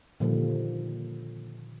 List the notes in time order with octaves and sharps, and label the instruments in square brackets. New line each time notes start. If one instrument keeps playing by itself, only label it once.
[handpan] A#2 D3 D#3 F3 G3